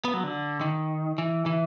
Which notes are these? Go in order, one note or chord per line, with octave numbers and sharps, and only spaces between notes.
B3
F#3
D3
D#3
E3
E3